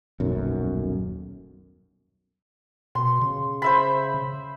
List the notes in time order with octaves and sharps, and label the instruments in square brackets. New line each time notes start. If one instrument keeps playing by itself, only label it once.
[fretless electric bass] D#1 B1 F#2
[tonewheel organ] B2 [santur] C6
[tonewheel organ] C#3
[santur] C5 E5 B5